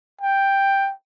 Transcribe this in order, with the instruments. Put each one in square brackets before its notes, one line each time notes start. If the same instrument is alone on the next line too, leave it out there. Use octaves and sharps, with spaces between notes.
[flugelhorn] G5